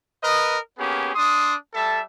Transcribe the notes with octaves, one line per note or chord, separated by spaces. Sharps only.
A#4 B4 D#5
A#3 B3 C#4 G4 G#4
D4 C6 D#6
G3 A4 E5 A5